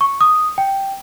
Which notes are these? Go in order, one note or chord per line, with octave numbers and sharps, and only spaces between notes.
C#6
D#6
G5